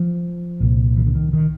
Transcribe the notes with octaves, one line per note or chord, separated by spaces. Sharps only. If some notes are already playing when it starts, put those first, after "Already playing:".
Already playing: F3
C2 A#2
E3
D3
D#3
D#3